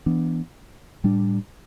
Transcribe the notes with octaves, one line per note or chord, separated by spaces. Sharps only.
E3 B3 D4
A2 G3 D4